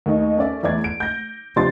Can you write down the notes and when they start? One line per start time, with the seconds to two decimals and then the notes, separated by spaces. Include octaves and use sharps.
0.06 D#2 A3 D#4
0.38 C#4 A4 D5 E5
0.63 E2 A3 D5 G#6
0.84 D7
1.00 G6 A#6
1.56 C3 F3 D4 C6 A6